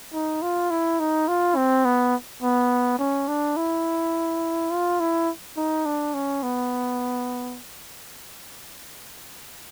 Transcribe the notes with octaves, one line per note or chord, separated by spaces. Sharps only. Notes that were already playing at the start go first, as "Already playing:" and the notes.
D#4
F4
E4
D#4
F4
C4
B3
B3
C#4
D4
E4
F4
E4
D#4
D4
C#4
B3